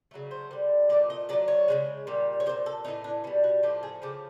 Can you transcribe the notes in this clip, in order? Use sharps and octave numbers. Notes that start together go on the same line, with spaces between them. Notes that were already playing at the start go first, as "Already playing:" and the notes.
C#3 F#3 A3
C5
D3 G3
A#2 F3 A3 D5
D#5
D3 F#3 A3 D5
C#5
C#3 F3 G#3
A#2 G3
C#5
G3 C5
A#2
A4
A2 E3 A3 D#4
D4
B2 G3 C#4
F#4
A2 F3 A3 G4
G#4
C#3 F3 A3 G4